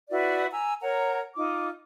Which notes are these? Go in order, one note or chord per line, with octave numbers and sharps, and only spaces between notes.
E4 F#4 B4 D5
G#5 A#5 E6
A#4 C#5 F#5 A#5
D#4 F4 D6